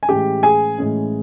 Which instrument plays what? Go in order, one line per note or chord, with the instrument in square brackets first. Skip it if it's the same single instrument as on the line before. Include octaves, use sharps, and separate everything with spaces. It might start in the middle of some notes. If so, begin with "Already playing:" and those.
[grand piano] G#5
A2 E3 G#3 C#4 G4 G5
G#4 G#5
A2 E3 G#3 C#4